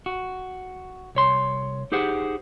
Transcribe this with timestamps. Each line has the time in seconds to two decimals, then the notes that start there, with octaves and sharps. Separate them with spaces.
0.06 F#4
1.15 C2 C#5 C6
1.92 D#4 G4 G#4 C5 F#5